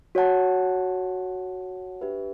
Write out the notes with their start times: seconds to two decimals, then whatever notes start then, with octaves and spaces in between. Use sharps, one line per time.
0.15 F#4 C#5 F#5 A5
2.01 D4 G4 B4 E5